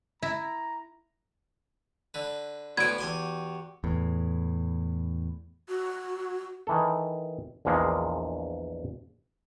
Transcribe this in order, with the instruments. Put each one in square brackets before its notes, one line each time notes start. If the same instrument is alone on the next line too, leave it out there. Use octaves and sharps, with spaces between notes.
[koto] E4 [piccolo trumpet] A#5
[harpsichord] D3 B4
[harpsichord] D2 A2 F#4 [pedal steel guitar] B3 B4 C5 [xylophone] G#6 D7
[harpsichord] E2 G#5 C6 [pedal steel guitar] F#4 G4
[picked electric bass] E2 A2
[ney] F#4
[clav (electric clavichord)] D#3 E3 A4
A#1 E2 A#2 F3 G#3